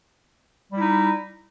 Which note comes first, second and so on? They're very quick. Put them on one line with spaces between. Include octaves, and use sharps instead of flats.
G3 E4 D#4